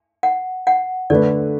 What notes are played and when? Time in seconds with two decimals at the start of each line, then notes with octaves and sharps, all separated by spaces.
0.23 F#5
0.67 F#5
1.10 D3 A3 D4 B4 D5